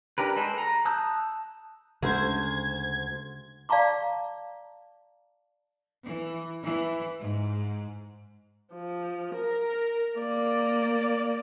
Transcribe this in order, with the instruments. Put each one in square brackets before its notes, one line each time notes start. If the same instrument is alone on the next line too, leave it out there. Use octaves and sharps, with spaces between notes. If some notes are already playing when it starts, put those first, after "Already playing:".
[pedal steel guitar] D4 G4 A#4 B4
G#3 A4 B4 C5
A#5
A5 D#6 E6 F#6 G6
[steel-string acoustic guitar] D2 C5 [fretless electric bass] C#3 G#3 C#4 [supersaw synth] G#6
[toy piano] D5 F5 A5 A#5 C#6 D6
[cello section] E3
E3
G#2
[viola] F3
A#4
A#3 D5